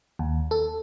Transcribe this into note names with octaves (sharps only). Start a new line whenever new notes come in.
D#2
A4